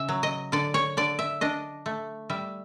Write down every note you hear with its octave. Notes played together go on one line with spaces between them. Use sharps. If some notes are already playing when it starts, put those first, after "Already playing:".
Already playing: C#3 E5
F#3
D#5
D3 D5
C#5
D3 D5
E5
D4 D#5
A3
G3 E5